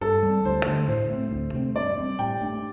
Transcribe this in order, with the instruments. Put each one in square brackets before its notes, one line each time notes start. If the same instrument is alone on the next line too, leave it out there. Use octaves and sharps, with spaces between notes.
[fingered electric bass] G2 [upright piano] A4
[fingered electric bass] G3 C4
[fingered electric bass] D2 [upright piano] C5
[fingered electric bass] D3 A3
[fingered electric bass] A2 [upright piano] C5
[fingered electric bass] A3 C4
D2
C3 A3 C4
[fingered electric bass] G2 [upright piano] D5
[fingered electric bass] G3 C4
[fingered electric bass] A2 [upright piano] G5
[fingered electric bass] A3 D4